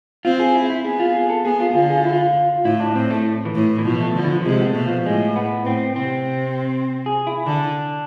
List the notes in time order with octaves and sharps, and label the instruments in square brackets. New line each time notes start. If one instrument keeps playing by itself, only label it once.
[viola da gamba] C4 [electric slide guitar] F4
[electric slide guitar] G#4
E4
E4
[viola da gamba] B3 [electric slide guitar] G#4
[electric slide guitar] F4
G#4
A4
[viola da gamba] B3 [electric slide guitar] G#4
[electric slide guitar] F4
[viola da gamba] D3 [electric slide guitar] F4
[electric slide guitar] G#4
F4
E4
F4
[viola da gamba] A2 [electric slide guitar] E4
[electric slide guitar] D4
[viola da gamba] A2 [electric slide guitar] C4
[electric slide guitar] A3
E3
[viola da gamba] A2
[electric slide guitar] E3
[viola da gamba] B2 [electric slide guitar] F3
[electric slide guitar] A3
[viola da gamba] D3 [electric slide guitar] F3
[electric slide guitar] E3
F3
F3
[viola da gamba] C3 [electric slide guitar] G#3
[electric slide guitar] B3
A3
[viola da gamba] B2
[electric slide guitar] F3
[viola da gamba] A2 [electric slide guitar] G#3
[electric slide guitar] B3
[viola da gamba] A2 [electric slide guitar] C4
[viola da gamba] C3 [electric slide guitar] C4
[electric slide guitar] G#4
E4
[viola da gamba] D3 [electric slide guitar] D4